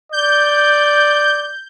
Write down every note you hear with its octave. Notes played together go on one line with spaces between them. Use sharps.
D5 G6